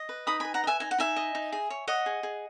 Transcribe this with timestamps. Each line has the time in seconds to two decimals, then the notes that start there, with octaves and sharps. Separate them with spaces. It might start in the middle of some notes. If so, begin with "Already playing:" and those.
Already playing: D#5
0.09 B4
0.27 D#4 B5 D#6
0.40 B4 G#5 B5
0.54 F#5 A#5
0.64 D#5
0.67 E5 G#5
0.80 D#4 G#5
0.91 F#5
0.98 D#4 E5 G#5
1.16 D#5
1.35 D#4
1.52 G#4
1.70 C#5
1.87 C#5 D#5 F#5
2.06 G#4
2.23 G#4